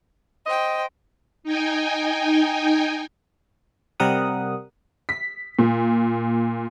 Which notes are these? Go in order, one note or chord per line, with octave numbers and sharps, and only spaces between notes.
C5 D#5 G5
D#4 G5 G#5
C3 G3 A#4 F#5 D#6
B6
A#2